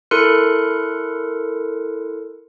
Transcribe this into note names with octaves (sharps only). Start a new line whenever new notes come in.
E4 A4 A#4 C6 F#6 C#7